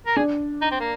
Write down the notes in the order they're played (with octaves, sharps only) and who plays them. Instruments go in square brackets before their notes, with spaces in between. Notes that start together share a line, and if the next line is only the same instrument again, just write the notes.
[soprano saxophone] A#4
[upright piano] D4 [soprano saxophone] G#4
[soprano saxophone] D#4
C4
A#3